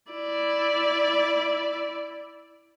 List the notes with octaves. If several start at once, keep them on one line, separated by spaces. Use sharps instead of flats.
E4 D5